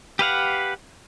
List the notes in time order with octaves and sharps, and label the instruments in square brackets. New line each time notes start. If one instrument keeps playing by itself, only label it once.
[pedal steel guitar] G4 B4 F5 F#5